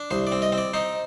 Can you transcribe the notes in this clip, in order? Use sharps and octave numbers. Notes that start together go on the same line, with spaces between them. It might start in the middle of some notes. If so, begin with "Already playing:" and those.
Already playing: D4
C2 C5
D5
C4
D#5
C4
D5
D#4 C5